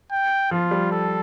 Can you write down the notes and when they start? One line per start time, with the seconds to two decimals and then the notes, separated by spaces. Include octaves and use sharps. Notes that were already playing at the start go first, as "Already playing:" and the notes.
0.12 G5
0.51 F3 F4
0.71 G3
0.92 A4